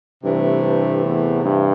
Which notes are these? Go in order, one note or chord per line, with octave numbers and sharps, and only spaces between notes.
G2 C3 E3 A3
G2
E2
G2